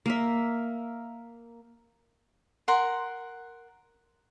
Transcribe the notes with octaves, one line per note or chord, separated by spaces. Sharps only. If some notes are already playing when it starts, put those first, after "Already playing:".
A#3 A#4 E5
A#4 F#5 C6